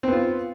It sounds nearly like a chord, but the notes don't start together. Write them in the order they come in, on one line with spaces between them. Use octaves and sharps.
C4 B3 F4